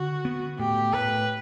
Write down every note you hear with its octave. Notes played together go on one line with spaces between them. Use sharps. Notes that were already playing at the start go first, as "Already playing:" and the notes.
Already playing: D3 F#4
B3
A2 G4
A2 B4